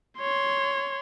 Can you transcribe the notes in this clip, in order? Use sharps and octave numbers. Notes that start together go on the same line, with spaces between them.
C#5 C6